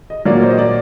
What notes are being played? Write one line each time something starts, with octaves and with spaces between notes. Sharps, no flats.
D#5
A#2 F#3 A#3 D5
C5
D#5
D5